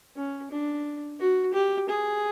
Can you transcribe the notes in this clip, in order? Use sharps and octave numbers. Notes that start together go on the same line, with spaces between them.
C#4
D4
F#4
G4
G#4